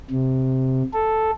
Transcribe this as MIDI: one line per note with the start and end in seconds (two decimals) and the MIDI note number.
0.11 0.83 48
0.93 1.31 69